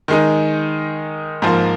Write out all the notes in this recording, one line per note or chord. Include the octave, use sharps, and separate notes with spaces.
D#3 G#3 D#4
G#2 F3 A#3